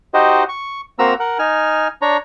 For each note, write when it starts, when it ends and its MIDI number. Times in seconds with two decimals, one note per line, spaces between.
0.14 0.43 63
0.14 0.43 66
0.14 0.43 67
0.14 0.43 72
0.14 0.43 75
0.49 0.81 85
0.99 1.14 58
0.99 1.14 60
0.99 1.14 66
0.99 1.14 82
0.99 1.14 88
1.20 1.38 70
1.20 1.38 78
1.39 1.88 63
1.39 1.88 80
1.39 1.88 89
2.02 2.17 62
2.02 2.17 73
2.02 2.17 82